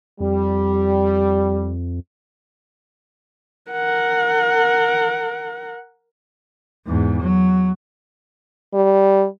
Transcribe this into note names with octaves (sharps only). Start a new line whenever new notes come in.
F2 G3
A#4 F#5
E2 G#2
F#3
G3